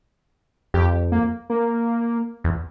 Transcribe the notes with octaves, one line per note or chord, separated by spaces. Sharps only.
F2 G4
A#3
A#3
E2